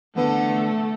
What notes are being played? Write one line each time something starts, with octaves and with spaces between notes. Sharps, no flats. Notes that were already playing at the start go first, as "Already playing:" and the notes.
D3 E3 A3 B3 A4 B4